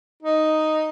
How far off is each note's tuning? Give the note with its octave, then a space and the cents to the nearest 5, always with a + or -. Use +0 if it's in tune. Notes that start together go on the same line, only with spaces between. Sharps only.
D#4 +0